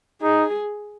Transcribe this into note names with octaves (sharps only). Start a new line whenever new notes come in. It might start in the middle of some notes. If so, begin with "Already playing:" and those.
D#4 G#4